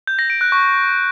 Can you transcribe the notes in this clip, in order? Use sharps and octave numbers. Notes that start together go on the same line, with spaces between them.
G6
A#6
D7
F#6
C#6